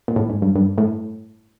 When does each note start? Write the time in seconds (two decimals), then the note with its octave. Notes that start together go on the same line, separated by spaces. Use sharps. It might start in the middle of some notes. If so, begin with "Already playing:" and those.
0.08 A#2
0.16 A2
0.29 G#2
0.42 G2
0.55 G2
0.78 A2